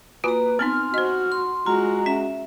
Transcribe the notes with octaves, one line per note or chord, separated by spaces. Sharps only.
A#3 F4 F#4 B4 G#5 A#5
B3 C4 D#4 G#5 C6 F6
F#4 C5 D#5
C6
G#3 F4 F#4 A#5
C#4 E5